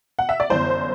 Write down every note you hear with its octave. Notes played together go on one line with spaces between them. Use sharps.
F#5
E5
D5
G1 F#2 E3 C5